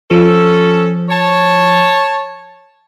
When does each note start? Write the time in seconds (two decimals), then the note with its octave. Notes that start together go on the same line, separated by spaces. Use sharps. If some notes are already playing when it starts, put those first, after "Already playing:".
0.11 F3 C#4 A4
1.09 C#5 A5